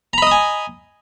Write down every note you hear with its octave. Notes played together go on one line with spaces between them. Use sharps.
D#5 G#5 A#5 B5 D#6